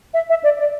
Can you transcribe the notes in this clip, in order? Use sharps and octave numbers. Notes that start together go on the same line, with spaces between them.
E5
E5
D5
D5